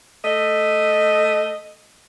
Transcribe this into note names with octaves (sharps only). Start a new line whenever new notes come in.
A3 D#5